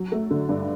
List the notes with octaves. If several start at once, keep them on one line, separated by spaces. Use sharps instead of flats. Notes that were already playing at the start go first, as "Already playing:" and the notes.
Already playing: F#3
A3
D3
G2